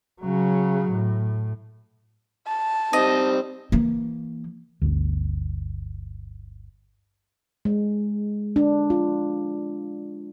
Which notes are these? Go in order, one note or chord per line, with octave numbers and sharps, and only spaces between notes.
C#3 F#3
A2
A5
G3 C4 D#4 D#5
E3 A#3
G1 D2
G#3
D4
F4